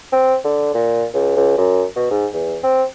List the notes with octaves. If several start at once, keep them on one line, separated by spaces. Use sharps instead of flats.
C4
D3
A#2
C#2
C#2
F#2
B2
G#2
E2
C4